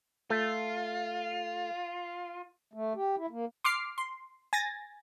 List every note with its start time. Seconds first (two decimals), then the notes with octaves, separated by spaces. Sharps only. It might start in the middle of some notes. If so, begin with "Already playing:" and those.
0.30 A3 F4
2.74 A3
2.95 G4
3.18 E4
3.30 A#3
3.64 C6 D6 F6 C7
3.98 C6
4.53 G#5 A6 A#6